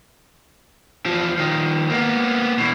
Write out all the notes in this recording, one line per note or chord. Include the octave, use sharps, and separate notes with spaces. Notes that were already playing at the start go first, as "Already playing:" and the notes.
E2 F3
D#3 F3
A#3 B3
B2 E3